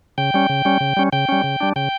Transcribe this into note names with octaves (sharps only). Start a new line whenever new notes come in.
C#3 G5
G3 C#4
C#3
G3 C#4
C#3
G3 C#4
C#3 G5
G3 C#4
C#3
G3 D4
C#3 G5